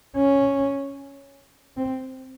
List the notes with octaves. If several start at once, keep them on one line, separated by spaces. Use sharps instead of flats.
C#4
C4